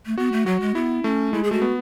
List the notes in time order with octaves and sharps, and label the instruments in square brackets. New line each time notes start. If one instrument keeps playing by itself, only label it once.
[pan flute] A3
[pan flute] B3 [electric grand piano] F#4
[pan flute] A3
[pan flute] F#3 [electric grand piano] F#4
[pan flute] G#3
[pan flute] B3 [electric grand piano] E4
[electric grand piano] A3 [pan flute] C#4
[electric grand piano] G#3 [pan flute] E4
[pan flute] G#4
[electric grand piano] A3 [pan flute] F#4
[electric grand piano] B3